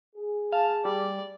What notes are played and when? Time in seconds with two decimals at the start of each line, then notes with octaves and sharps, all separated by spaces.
0.16 G#4
0.53 F5 A5
0.85 G3 D5